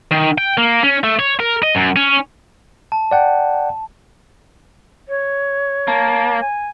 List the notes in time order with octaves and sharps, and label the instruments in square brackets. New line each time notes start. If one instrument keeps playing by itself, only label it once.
[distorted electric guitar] D#3
G5
A#3
C#4
A3
C#5
A#4
D#5
F#2
C#4
[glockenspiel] A5
[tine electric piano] D5 F#5 G5
[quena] C#5
[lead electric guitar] A#3 [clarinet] A5
[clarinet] G#5